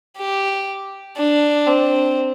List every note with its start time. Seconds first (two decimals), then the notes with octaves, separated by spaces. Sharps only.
0.18 G4
1.17 D4
1.67 C4